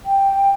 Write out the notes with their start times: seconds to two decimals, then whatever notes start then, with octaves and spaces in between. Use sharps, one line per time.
0.06 G5